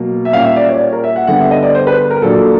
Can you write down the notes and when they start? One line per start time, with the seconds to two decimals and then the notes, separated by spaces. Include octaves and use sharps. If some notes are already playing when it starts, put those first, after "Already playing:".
Already playing: B2 F#3 A#3
0.25 E5
0.33 A#2 G3 A#3 C#4 F5
0.45 E5
0.56 D5
0.69 C#5
0.74 D5
0.81 C#5
0.93 A#4
1.04 E5
1.16 F#5
1.27 G2 D3 G3 B3 F#5
1.39 E5
1.51 D#5
1.63 D5
1.75 C5
1.87 B4
2.10 A#4
2.22 A#2 F#3 A#3 D4 A4